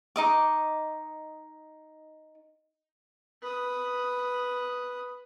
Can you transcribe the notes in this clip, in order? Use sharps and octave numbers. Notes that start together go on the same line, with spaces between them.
D#4 D#5 D6
B4 D#6